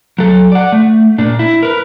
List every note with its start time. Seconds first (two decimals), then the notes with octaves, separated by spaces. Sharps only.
0.18 F#3 A4
0.52 D5 F#5
0.72 A3
1.18 A#2 D4
1.39 E4
1.62 A#4 B4